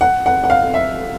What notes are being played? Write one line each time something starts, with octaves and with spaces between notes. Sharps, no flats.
F#5
F#5
F#5
F5
E5